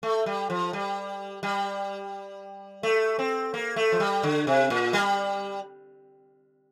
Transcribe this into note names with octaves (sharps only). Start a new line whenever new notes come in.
A3
G3
F3
G3
G3
A3
C4
A#3
A3
F3
G3
D3
C3
A#2
G3